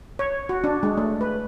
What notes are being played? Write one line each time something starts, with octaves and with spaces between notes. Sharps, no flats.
C#5
F#4
D4
G#3
A3
B4